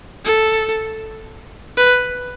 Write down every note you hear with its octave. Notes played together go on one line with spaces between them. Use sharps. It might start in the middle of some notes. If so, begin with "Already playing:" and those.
A4
B4